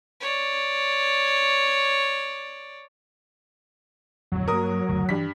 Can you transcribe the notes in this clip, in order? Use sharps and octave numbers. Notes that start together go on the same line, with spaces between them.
C#5 D5
D1 F2 F#3
G2 A#3 A#4 D#6
F#1 D2
G2 E3 B6